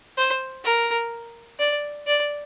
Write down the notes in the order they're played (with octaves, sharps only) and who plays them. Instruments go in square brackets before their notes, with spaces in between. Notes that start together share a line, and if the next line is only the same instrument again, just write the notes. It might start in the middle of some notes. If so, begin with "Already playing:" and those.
[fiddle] C5
A#4
D5
D5